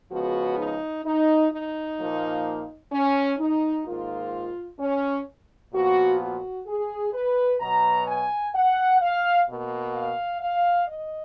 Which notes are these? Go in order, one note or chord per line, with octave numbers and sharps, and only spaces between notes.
C#3 F3 G#3 B3 F#4
D#4
D#4
D#4
A#2 F3 A#3
C#4
D#4
G#2 D#3 A#3 F4
C#4
A#2 F3 B3 F#4
F#4
G#4
B4
B2 F#3 B3 A#5
G#5
F#5
F5
B2 A#3
F5
F5
D#5